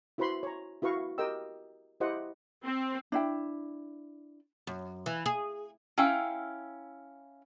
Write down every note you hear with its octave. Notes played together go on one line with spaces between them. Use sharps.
E4 F#4 B4 C5 B5 C6
C#5 A#5
E4 F#4 B4 F5 C#6
G4 A#4 D#5 G5 E6
E4 G4 C5 D#5 F#5
C4
D4 E4 G5
F#2
E3
G#4
C#4 E4 F5 G5